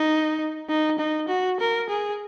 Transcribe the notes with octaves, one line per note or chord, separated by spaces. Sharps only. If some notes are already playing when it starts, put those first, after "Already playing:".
Already playing: D#4
D#4
D#4
F#4
A#4
G#4